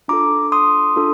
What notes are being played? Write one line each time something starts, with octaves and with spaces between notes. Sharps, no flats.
D4 F4 A4 A#5 D6
C6 D#6
D4 F4 A4